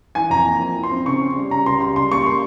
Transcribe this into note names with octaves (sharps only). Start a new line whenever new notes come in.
E3 G#5
F2 A#5
A#3
F3
E4
C6
C4
C#3 C#6
C#4
G3
C#3 A#5
C#2 C6
G3 C6
C#3 C6
A#3 C#6
G3 C6